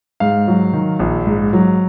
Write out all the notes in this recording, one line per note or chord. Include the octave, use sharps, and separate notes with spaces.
G#2 F5
F#3
D#3
A#1
G#2
F#3